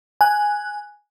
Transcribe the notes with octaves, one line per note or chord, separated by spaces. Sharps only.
G#5 F#6